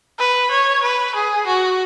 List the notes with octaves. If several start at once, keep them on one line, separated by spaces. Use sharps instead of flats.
B4
C#5
B4
G#4
F#4